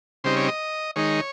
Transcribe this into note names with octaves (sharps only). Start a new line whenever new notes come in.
C#3 G3 C4 D#4 C5
C#5
D#5
D#3 G#3 D#4 C#5